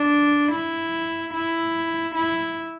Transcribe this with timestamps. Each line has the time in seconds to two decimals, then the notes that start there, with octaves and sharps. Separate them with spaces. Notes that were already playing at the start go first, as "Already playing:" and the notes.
Already playing: D4
0.51 E4
1.33 E4
2.14 E4